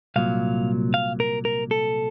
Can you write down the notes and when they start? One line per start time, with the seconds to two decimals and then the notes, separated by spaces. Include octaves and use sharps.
0.16 C2 A#2 F#3 F5
0.94 F5
1.20 A#4
1.45 A#4
1.71 A4